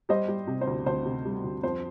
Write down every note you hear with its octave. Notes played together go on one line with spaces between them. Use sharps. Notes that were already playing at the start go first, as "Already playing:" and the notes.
G3 C5 D#5
G3
C3
C5
D2
D2 C5
C3
G3
D2
F2 C5